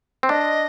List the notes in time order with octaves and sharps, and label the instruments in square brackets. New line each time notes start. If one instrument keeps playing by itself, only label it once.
[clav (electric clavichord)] C4
[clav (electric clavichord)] D4 [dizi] D#5